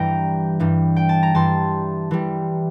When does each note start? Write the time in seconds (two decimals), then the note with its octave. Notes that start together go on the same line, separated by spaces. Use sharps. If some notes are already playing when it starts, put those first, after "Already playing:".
Already playing: G2 E3 G3 G5 A#5
0.60 G2 E3 G3
0.96 G5
1.09 A5
1.23 A#5
1.35 G2 E3 G3 A5 C6
2.11 E3 G3